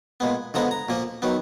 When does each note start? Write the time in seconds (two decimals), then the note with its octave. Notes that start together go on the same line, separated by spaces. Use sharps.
0.20 A#2 G#3 B3
0.54 D3 F3 G#3 B3 A#5
0.71 A#5
0.89 A#2 F3 A#3
1.22 D#3 F#3 B3